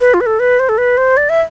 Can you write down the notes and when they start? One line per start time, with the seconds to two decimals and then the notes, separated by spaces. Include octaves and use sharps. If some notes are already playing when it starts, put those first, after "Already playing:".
0.01 B4
0.14 F4
0.21 B4
0.26 A4
0.39 B4
0.59 C5
0.69 A4
0.78 B4
0.97 C5
1.17 D5
1.29 E5